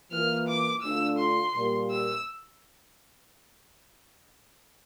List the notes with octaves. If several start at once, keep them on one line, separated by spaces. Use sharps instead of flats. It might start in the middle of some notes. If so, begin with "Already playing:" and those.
E3 A#3 F4 F6
D6
D3 A3 D4 F4 E6
C6
A#2 G3 A#3
E6